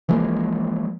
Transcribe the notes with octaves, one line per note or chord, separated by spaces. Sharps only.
E3 F3 G#3 A#3